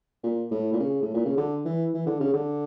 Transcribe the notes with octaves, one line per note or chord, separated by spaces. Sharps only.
A#2
A2
A#2
C#3
A2
A#2
C#3
D3
E3
E3
D3
C#3
D3